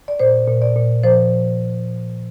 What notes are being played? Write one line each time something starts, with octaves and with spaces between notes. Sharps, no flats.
D5
A#2 C5
A#2
D5
A#2
F3 C5